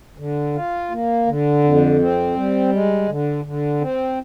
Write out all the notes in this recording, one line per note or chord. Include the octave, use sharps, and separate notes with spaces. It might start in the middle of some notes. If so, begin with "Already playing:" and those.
D3
F4
A#3
D3
F2
C4
G3
G#3
D3
D3
C4